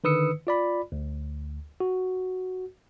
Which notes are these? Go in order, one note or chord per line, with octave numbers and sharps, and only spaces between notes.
D3 D#3 B4 D#6 E6 C#7
F4 D5 B5
D2
F#4